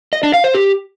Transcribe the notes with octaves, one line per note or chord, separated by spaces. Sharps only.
D#5
D4
F5
C5
G4